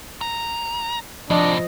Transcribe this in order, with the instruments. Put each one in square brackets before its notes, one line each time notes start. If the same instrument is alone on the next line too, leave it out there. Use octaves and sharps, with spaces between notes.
[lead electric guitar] A#5
[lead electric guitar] A2 C3 [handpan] F3 D#5 [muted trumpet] D4